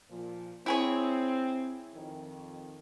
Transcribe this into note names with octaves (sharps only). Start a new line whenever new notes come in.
A#2 F3
C4 E4 G#4 C#5
F2 D#3